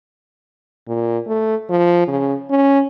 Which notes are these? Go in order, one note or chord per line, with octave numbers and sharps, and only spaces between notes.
A#2
A3
F3
C#3
C#4